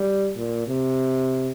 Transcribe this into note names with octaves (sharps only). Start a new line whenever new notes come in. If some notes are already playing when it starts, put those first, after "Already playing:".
Already playing: G3
A#2
C3